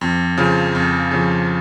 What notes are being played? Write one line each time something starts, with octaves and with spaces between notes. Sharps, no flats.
F2
C#3 F3
F2
C#3 F3